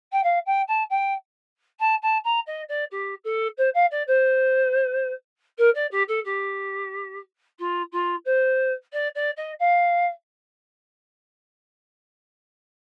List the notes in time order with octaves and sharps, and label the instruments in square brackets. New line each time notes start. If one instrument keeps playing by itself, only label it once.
[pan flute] G5
F5
G5
A5
G5
A5
A5
A#5
D#5
D5
G4
A4
C5
F5
D5
C5
A#4
D5
G4
A4
G4
F4
F4
C5
D5
D5
D#5
F5